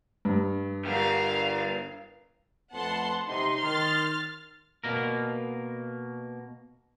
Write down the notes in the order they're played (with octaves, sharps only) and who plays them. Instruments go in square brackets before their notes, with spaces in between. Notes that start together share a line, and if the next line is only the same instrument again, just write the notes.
[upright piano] G2
[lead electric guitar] D3 G3 [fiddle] A#4 F5
[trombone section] F2 A3 B3 [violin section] F#5 A5 C6
[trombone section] C3 [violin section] D#4 [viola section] C6
[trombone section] D#3 [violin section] F6 A6
[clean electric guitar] B2 A#3 A#4